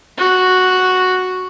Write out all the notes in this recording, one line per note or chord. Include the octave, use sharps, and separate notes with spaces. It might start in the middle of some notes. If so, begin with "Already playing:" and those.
F#4